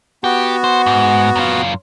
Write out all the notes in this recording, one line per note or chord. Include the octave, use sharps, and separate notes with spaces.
B3 F#4 G4
C5
G#2
F#2 F4